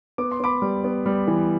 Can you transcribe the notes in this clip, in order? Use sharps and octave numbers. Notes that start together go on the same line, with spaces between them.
B3 D6
C6
B3 B5 D6
G3
B3
G3
E3